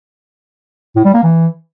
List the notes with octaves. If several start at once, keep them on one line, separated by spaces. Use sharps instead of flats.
A2
G3
A#3
E3